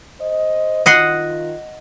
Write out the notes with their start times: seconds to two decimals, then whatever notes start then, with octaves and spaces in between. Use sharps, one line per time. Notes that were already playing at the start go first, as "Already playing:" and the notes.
0.21 C5 D#5
0.86 D#3 F4 D#5 F#5 C6